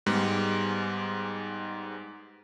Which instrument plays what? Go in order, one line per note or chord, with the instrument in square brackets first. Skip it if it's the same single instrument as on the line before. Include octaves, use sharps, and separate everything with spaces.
[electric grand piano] G#2 G3 G#3 B3